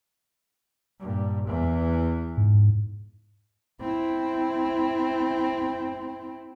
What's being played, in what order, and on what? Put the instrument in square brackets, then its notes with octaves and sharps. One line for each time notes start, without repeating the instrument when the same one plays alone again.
[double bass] G2 A#2
E2 E3
[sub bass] G#2
[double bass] C4 E4